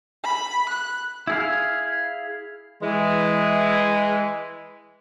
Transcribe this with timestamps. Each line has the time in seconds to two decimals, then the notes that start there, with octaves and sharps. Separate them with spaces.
0.23 B5
0.69 F#6
1.27 E4 G#4 F5
2.82 E3 G#3